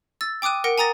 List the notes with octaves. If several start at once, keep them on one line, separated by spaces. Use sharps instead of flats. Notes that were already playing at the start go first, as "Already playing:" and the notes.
E6 A6
G5 D6 D#6 F#6 D#7
A#4 F#5 A#6 C#7 D7
G#5 A#5 D#6 A6 A#6